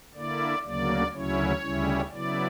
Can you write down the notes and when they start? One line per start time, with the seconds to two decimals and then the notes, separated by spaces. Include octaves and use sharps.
0.14 D3 A#3 E4 D5
0.64 D2 C#3 F#3 A#3 D5
1.13 D2 C#3 F#3 C#4 E4 C#5
1.62 D2 C#3 G3 C#4 E4
2.11 C#3 F#3 B3 E4 D5